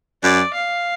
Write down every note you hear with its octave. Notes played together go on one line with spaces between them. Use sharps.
F#2 D5
F5